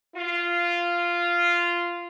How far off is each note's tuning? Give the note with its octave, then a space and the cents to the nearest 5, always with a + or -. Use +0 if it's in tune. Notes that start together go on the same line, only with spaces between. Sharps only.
F4 -10